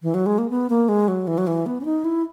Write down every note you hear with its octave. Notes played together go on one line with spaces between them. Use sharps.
E3
F#3
G#3
A#3
B3
A#3
G#3
F#3
E3
F#3
E3
B3
C#4
D#4
E4